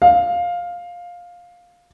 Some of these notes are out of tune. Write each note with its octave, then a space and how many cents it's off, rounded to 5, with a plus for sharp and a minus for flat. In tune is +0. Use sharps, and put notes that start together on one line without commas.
F5 +10